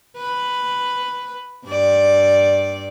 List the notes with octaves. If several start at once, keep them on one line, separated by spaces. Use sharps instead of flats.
B4
G2 D5